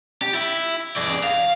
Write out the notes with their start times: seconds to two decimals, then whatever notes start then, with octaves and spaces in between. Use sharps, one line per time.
0.22 G4
0.35 E4
0.97 G#4 D5
1.23 F5